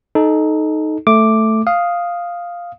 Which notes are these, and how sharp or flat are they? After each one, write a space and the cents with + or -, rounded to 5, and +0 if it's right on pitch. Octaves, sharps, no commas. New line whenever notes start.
D#4 +0 A4 -20
A3 +0 D6 +0
F5 +0 D#6 +0